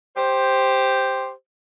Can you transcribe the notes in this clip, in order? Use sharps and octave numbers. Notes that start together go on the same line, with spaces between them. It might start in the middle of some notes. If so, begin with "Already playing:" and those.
G4 C5